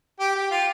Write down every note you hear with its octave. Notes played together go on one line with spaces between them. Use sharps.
G4
G4
F4